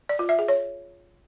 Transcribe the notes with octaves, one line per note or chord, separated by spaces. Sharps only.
D5
F4
E5
G#4
C#5